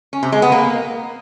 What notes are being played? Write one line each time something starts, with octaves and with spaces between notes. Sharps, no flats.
C#4
C3
G#3
B3
A#3